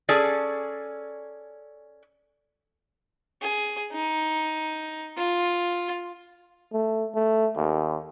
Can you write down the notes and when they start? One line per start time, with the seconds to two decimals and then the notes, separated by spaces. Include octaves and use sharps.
0.09 C#4 G#4 A4 D5
3.42 G#4
3.93 D#4
5.17 F4
6.73 A3
7.15 A3
7.56 D#2